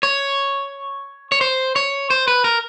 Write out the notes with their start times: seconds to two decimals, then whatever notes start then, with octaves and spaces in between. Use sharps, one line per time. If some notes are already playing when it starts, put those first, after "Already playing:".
0.03 C#5
1.32 C#5
1.41 C5
1.76 C#5
2.10 C5
2.28 B4
2.44 A#4